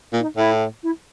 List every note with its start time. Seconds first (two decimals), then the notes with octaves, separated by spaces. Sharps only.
0.13 A#2
0.20 D#4
0.37 A2 E4
0.82 E4